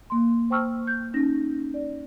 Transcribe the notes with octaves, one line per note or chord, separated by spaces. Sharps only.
A#3 C6
C5 G5 A5 C#6 E6 F6
G6
C#4 D#4 A#6
D5